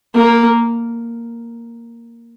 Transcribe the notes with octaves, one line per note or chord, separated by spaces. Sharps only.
A#3